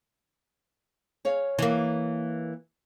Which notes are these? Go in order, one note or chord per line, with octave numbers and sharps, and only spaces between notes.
G#4 C#5 F5
E3 A#3